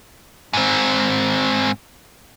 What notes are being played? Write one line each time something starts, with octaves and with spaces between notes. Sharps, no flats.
G#2 C4